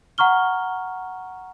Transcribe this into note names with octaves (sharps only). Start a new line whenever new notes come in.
F#5 A#5 C#6 F6 G7